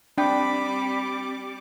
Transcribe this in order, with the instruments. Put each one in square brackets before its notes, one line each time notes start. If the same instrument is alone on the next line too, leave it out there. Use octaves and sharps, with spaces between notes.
[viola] G3 D6 [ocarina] C4 [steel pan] D4 G5 [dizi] B5